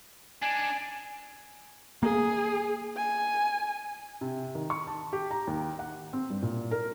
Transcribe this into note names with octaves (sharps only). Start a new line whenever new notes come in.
D4 D#4 G#5
A#3 G#4
G#5
C3
D#3
C#6
A5
G4
A#5
D#2
F#5
C4
G2
A#2
A#4